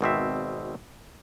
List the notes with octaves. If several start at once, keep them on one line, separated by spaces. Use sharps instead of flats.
G#1 B2 C4 E5